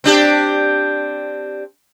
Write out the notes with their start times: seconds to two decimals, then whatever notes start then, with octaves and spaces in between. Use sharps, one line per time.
0.04 C4 D4 G4